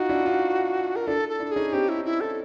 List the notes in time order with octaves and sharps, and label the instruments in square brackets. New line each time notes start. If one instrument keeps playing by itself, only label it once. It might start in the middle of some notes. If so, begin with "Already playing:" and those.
Already playing: [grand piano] D#4 F4 [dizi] F#4
[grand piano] D4 E4
D#4 F4
[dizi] A#4
[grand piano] D4 E4 [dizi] A4
[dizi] A4
[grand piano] D4 E4
[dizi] G#4
[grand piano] C#4 D#4
[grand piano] C4 D4 [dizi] G4
[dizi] E4
E4
A4